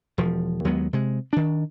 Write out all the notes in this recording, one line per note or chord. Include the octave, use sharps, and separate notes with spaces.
E1 F3
D#2 F#3 G#3 B3
C3 G#3
D#3 D4